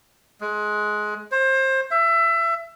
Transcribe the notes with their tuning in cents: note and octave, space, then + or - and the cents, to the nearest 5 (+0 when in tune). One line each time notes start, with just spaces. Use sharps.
G#3 +20
C5 +25
E5 +25